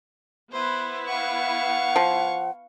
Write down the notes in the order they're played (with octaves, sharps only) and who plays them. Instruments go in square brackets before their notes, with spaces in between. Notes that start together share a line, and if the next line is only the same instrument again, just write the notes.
[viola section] B3 E4 B4 [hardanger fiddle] C5
[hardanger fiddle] F5 C#6 [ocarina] F#5
[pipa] F3